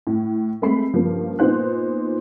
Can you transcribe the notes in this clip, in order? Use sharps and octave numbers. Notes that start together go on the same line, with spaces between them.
A2
G#3 A3 C4 B5 C7
G2 C#3 F3 A#3
A#2 B3 D#4 C5 F#6